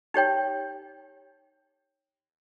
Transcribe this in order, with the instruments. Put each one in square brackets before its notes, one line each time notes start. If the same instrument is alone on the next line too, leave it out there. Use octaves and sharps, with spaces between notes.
[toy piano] D#4 G4 C#5 G5